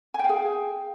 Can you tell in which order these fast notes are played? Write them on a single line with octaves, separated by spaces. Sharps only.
G#5 G5 F5 G#4